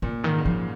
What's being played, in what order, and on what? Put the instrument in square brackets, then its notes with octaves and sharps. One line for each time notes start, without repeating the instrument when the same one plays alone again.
[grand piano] A#2 [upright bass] C#3
[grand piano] G#2 [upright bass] D#3
[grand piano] C#3
[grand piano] A#2 [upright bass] F3